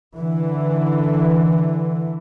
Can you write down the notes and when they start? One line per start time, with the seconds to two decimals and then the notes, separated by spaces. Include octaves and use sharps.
0.18 D3 E3